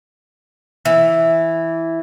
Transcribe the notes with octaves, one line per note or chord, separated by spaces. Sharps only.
E3